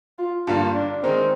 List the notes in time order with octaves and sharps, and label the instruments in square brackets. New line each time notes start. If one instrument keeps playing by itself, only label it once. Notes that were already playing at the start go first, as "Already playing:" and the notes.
[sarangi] F4
[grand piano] G2 D3 G3 A#3 [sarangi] F4
[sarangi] D4
[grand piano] D#3 G#3 D#4 A#4 [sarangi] C4